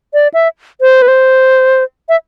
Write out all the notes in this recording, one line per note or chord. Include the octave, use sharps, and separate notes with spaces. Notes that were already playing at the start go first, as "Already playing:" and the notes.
D5
E5
C5
B4
C5
E5